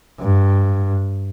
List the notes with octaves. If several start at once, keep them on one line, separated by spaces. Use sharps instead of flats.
G2